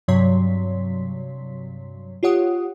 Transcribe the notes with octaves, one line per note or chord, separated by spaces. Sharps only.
G2 C3 F#3 C#5 C6 B6
F4 G4 C#5 F#5 D#6